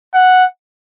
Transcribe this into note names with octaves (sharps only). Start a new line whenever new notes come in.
F#5